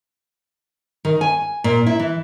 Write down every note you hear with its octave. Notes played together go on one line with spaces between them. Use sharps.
D#3
G#5
A#2
E4
E3